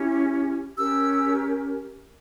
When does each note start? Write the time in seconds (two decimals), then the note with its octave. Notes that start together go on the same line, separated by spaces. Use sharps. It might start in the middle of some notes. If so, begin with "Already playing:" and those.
Already playing: C#4 E4 G4
0.77 C#4 G4 A#4 E6